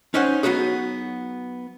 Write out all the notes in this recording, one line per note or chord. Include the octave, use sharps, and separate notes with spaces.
C#4 D#4 C5 C#5 F#5
F#3 A#3 B3 D#4 F#4 G#4